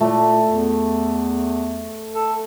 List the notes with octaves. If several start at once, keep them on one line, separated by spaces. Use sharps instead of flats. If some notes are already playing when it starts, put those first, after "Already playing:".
A#2 A3
E2
A4